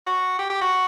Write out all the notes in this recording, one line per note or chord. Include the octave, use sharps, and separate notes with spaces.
F#4
G4
G4
F#4